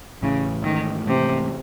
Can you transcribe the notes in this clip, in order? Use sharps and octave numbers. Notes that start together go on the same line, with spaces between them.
A1 A2 C#3 E3
G#2 D#3 E3 A3
G#2 C3 E3 A3